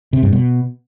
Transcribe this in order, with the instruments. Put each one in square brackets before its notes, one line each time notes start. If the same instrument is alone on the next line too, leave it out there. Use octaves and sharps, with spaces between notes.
[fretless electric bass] C3
G2
B2